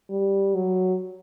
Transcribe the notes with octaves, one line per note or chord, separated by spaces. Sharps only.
G3
F#3